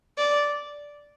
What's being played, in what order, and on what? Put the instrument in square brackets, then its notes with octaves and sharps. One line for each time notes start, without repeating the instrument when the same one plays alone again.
[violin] D5